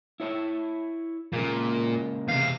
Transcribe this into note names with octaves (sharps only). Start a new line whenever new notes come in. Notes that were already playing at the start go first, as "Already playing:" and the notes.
E4 C#5 E5
A#2 C#3 G#3 A#3
E2 C3 F5